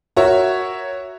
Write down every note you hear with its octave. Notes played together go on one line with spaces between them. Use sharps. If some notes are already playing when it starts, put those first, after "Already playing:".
F#4 A#4 C#5 E5